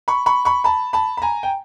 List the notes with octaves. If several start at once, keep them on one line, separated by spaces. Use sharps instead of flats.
B5 C#6
B5 C#6
B5 C#6
A5 B5
A5 B5
B5
G#5 A#5
G5